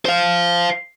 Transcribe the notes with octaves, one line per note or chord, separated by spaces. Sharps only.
C5 F5